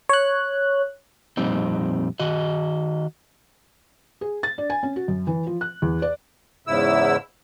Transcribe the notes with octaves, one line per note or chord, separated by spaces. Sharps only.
C#5 F#6
F2 A#2 G3 C4 D#4
D#3 F#4 D#5
G#4
A6
D4
G#5
C#4
F#4
F#2
E3
F3
F#6
E2
D5
E2 G#2 C#3 E4 E6